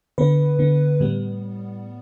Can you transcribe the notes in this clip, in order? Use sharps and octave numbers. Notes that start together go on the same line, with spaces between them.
D3 B3 B4
D3 B3
A2 G3 B3